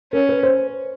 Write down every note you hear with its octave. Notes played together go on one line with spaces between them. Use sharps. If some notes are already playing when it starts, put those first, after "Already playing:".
C#4 A#4
B4
C5